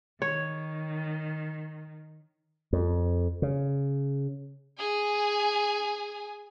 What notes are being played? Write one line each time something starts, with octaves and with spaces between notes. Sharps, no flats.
D#3 C#5
F2
C#3
G#4 G#5